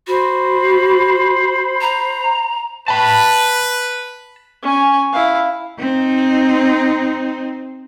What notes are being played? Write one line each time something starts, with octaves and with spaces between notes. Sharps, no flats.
F#4 C5 B5
A#5
B4 A5 B5
C#4 G#5
E4 F5
C4 D#4